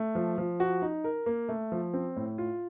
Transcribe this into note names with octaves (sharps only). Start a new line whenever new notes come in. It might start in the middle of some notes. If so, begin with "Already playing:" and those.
Already playing: A3
F3
F3
F#4
D#4
A#4
A#3
A3
F3
C4
A2
F4